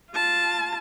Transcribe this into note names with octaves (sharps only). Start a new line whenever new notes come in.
F4 A5